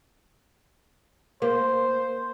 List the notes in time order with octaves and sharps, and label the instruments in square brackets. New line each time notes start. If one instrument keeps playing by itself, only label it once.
[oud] A#3 [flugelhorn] C5